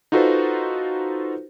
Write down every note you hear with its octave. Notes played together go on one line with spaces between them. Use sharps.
D#4 F4 F#4 A4 B4 C5